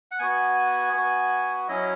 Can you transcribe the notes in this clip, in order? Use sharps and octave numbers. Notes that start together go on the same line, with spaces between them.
F#5
B3 F#4 G#5
B3 F#4
F#3 C#4 E4 D#5